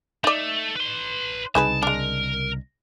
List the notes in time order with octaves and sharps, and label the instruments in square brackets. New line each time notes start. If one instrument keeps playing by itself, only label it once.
[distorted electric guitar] A3 [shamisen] D#4 D5
[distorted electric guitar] B4 C6
[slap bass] C2 C#3 [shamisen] D#4 G#4 B4 [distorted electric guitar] A5
[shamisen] G#3 D4 [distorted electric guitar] A#4